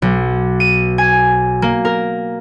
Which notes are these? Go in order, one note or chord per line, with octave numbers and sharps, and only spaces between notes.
B1
D#7
G#5
A#3
A#4